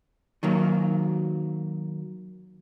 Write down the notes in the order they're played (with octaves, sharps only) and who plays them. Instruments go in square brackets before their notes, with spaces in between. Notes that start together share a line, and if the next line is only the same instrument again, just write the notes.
[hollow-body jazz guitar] D#3 F#3 A#3